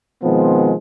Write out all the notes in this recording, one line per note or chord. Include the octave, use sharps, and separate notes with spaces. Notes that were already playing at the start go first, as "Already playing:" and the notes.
B2 D#3 F3 G#3 B3 C4